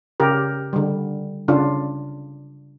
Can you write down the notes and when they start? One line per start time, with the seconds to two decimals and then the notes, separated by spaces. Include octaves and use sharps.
0.20 C#3 G4 A#4
0.73 D3 G3
1.48 C#3 D4 F4